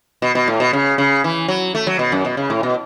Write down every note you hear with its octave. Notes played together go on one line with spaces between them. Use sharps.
B2
B2
A2
B2
C#3
C#3
E3
F#3
A3
F#3
B2
F#2
B2
C#3
A2
B2